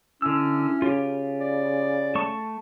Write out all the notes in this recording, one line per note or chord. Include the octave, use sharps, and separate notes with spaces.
D3 C#4 E4 E6
C#3 F4 G4
D5
A3 A5 C#6